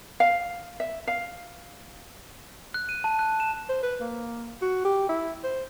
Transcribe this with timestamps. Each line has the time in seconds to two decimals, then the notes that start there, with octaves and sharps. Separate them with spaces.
0.20 F5
0.80 E5
1.07 F5
2.74 F#6
2.89 D#7
3.04 A5
3.19 F#6
3.40 E7
3.69 C5
3.83 B4
4.00 A#3
4.62 F#4
4.85 G4
5.09 E4
5.44 C5